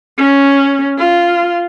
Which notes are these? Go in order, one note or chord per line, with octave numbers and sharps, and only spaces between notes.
C#4
F4